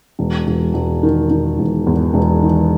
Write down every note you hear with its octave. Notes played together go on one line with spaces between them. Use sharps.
E1
E1
E1
D#3
D#3
E1
E2
E1
D#3